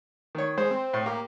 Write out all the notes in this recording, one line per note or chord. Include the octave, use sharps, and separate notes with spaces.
D#3 C#5
G#3 C5
C4
A2
A#3 G4